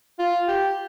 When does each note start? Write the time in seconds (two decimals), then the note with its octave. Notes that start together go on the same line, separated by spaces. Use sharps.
0.19 F4
0.48 G4